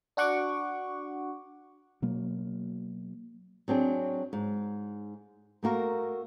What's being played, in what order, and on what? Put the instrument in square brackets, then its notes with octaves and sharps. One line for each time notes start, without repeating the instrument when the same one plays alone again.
[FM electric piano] D4 F#4 F#5 C#6 D6
[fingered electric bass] B2 F#3 A#3
[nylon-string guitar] F#3 C4 D4 G#4
G#2
A3 A#3 F#4 A#4